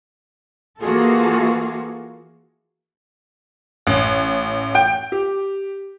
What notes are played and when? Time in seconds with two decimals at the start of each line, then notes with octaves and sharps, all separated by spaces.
0.81 E3 A#3 F4 F#4 G#4 A4
3.87 A1
4.75 G5
5.12 G4